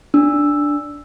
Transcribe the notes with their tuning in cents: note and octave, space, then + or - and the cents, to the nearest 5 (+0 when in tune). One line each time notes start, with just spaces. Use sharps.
D4 +0 E6 +0